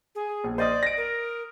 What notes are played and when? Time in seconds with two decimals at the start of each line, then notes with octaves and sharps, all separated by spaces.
0.15 G#4
0.44 A#1
0.58 C5 D5 D#5 D#6
0.83 A#6 D7
0.97 A#4